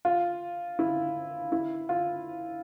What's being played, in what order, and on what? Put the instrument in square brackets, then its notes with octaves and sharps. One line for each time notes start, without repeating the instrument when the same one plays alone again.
[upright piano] F4
E4
E4
F4